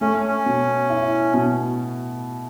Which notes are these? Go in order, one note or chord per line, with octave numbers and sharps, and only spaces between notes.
A3 C#4
C#4
B2
E4
B2